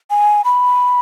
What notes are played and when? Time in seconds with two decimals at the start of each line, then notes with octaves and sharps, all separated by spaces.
0.10 G#5
0.45 B5